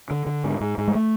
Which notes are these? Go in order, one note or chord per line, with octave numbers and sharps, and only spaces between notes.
D3
D3
G#2
G#2
G#2
G#3
A3